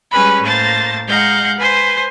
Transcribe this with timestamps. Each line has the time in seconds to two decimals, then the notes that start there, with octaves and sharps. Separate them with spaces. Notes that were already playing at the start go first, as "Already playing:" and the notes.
0.11 G3 G#3 C#4 G#4 B4 B5
0.42 A2 A#3 C5 A5 A6
1.07 G#3 D#4 F5 F#5 G6
1.58 B4 C5 G#5 C6